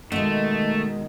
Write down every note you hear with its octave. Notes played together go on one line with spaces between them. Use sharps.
B2 D#3 G#3 A3